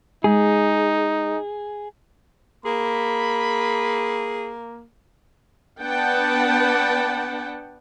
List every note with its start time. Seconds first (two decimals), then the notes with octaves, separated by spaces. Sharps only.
0.24 G#3 D#4 G#4
2.65 A#3 G#4 B5
5.80 B3 D4 B4 F#5 G5 A5